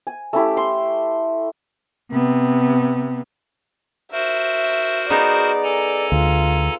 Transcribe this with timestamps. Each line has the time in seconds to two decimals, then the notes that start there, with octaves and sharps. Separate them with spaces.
0.07 G#5
0.33 A3 C#4 E4 G4
0.57 C6
2.12 C3 B3
4.12 F#4 A#4 C5 E5
5.10 B3 D#4 G#4 D5
5.63 A4 G#5 A#5
6.12 D2 F4